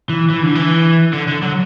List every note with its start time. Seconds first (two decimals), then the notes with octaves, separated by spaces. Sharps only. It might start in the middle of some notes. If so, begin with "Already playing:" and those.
0.09 E3
0.30 E3
0.43 D3
0.55 E3
1.14 D3
1.28 D3
1.42 F#3